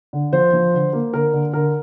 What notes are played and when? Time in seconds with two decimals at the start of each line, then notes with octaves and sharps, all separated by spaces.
0.13 D3
0.33 F3 C5
0.53 F3
0.74 D3
0.93 A#3
1.14 D3 A#4
1.34 D3
1.53 D3 A#4